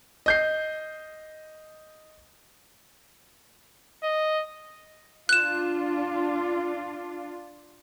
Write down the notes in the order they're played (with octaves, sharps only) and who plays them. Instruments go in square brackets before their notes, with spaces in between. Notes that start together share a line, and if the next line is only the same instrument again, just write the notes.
[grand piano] D#5 G6 C7
[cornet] D#5
[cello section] D4 F4 [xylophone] F#6 E7